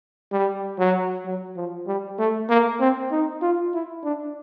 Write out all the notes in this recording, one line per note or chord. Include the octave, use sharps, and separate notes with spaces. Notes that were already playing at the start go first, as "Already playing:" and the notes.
G3
F#3
F#3
F3
G3
A3
A#3
C4
D#4
F4
E4
D4